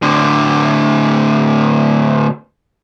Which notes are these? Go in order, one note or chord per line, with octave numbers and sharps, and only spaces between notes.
A2 D3